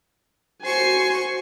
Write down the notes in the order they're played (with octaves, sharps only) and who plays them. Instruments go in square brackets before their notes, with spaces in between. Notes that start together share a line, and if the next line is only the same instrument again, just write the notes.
[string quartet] F#4 C5 C#6 [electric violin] G#5 C7